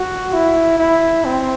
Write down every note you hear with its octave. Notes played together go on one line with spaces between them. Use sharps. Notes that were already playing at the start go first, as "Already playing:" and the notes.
Already playing: F#4
E4
E4
C4